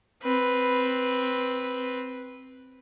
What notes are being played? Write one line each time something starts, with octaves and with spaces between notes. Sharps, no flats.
C4 B4